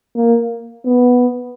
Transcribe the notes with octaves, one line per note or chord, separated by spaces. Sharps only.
A#3
B3